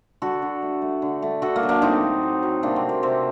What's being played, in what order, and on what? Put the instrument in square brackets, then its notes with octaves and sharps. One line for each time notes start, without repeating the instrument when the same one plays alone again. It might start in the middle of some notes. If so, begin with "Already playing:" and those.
[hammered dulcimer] D3 F#4 A4
D3
A3
A3
D3
A3
D3 F#4 A4
A#3
F#3
A#3 D4
A2 C4 D#4
A3
A2
F#3
C3 A#3 D4
C4
A3
A#3
C3 C4